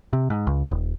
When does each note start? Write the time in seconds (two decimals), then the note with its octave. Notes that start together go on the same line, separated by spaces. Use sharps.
0.13 C3
0.30 G#2
0.47 C#2
0.71 D#1